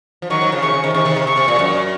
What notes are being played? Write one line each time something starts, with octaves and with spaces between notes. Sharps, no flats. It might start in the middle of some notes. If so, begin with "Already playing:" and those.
F3
D#3 F#3 C#6
D#3 F#3
C#3 F3
C3 D#3 C#6
C#3
C3 D#3
C3 D#3 C#6
C3 D#3
C3
C3 C#6
C3
A#2
F#2